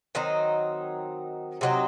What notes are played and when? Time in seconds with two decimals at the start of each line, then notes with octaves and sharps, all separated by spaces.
0.15 D#3 F#3 C4 D#4
1.61 C3 F#3 C4 D#4